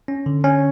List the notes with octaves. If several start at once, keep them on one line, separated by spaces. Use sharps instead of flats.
C#4
D3
C#4